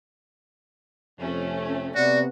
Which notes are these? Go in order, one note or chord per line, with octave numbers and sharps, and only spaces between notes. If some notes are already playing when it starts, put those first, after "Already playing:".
F2 C3 A3 C#4
C3 B3 F#4 D5